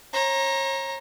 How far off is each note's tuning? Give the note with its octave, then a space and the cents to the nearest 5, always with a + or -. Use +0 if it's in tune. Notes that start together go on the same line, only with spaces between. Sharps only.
C#5 -40 A#5 +10